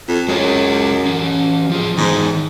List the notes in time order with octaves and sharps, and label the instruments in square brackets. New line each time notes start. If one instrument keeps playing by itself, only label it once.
[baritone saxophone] F2
[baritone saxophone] F#2 [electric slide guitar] G#3 G#4 C#5
[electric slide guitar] E3 C#4
F3 F4 G#4
[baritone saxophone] G#2 [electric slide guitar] D#3 E3 B3